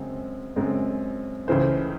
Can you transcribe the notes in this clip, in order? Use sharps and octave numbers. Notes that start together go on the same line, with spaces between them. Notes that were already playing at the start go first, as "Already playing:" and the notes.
Already playing: F#2 C#3 G#3 C4
F#2 C#3 G#3 C4
C#2 C#3 E3 A3 C5